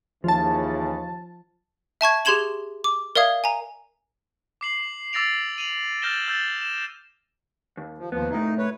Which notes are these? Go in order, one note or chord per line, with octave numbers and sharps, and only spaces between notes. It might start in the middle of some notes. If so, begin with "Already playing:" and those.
D#2 C#3 E3 F3 A5
E5 A5 C#6 G#6
G4 G#4 C6 G#6 E7 F#7
D6
A#4 D5 E5 F5 D#6 G#6
G#5 A#5
D6 C7 F#7
D6 E6 A6 A#6 D7 F7
D#7 F7 F#7
F6 G6 A6 A#6 E7 G7
E6 G6 A6
E7
D#2
F3
D#2 F3 B3
C2 A2 D#4
B4 C#5